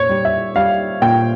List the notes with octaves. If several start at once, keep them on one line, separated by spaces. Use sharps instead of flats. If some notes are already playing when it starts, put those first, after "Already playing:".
Already playing: A#2 C#5
G3
E5
G3 F5
A#2 G5